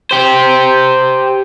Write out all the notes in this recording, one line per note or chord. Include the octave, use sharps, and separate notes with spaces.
G4 C5